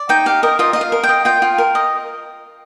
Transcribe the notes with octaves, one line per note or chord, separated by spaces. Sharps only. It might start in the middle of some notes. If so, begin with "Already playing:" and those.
Already playing: D5
D#4 G5
G4 F5
A#4 D#5
F4 D#5
F4 D#5
F5
A#4
G5
D#5
F4 G5
F4
A#4
D#5